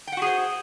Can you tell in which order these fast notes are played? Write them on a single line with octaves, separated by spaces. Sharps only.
G5 F#5 F#4 G#4 C5